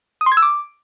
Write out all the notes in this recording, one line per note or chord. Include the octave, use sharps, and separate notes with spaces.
D#6
C6
G#6
E6
D6